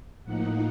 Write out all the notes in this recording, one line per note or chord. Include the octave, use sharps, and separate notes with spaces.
A2 F3 A#3 D#4 F#5